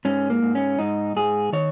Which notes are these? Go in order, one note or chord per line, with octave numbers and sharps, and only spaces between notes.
G#2 C#4
A#3
G#2
C#4
G#2 D#4
G#2 G#4
D#3 C#5